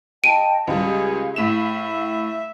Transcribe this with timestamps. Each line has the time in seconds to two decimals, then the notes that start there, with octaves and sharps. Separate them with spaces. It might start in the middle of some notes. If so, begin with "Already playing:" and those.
0.24 D#5 G5 A5 D7 D#7
0.67 C#2 G3 G#4 F5
1.36 A2 E5 B6 E7